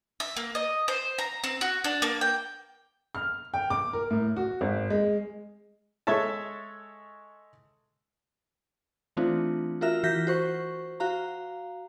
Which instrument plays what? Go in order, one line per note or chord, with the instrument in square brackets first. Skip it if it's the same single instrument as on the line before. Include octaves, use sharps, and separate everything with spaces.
[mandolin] E5
A#3
D#5
C5
A#5
C4
F#4
D4
A#3
G5
[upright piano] F6
G5
D6
A#4
A2
F#4
G#1
G#3
[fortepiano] G#3 A4 C#5 E5 A5
[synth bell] E3 A3 C4 D4 F4
F4 F#4 A#4 E5 F6
E3 F#4 G6 A#6 B6
F#4 C5 C#6
F#4 F5 A#5